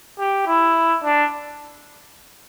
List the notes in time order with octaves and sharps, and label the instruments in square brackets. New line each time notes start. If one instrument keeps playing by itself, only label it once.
[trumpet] G4
E4
D4